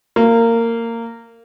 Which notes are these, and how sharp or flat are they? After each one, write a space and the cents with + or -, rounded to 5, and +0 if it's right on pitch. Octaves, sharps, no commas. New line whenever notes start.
A#3 -20